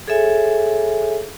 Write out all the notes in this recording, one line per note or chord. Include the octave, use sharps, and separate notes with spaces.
G#4 A4 C#5 E5 G#5